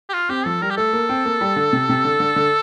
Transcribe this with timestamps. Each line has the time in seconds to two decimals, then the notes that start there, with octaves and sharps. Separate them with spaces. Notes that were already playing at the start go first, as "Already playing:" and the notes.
0.09 G4
0.13 F4
0.29 C4 G4
0.45 F3 A4
0.61 G3 A#4
0.70 G4
0.77 A3 A4
0.93 A#3
1.09 C4
1.25 A#3
1.41 G3
1.56 D3
1.73 C3
1.89 C3
2.05 D3
2.20 D3
2.36 D3